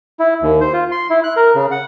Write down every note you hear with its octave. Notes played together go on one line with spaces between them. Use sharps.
E4
D#2
C5
F4
C6
E4
F#6
A#4
C#3
F#5